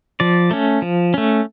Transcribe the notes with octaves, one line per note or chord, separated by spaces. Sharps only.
F3 D5
A3 C#4
F3
A3 C#4